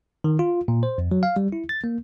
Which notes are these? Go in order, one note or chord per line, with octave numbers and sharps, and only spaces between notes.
D#3
F4
A#2
C5
F2
F#3
F5
G3
E4
A6
A#3